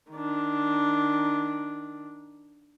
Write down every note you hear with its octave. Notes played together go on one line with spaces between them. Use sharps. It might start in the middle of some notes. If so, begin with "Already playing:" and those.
D#3 D4